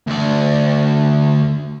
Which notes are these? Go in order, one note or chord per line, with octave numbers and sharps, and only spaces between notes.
D2 D5